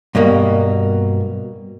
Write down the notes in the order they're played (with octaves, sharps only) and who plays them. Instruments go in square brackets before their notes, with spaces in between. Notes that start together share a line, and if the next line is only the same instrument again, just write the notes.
[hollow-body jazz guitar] G2 B2 A#3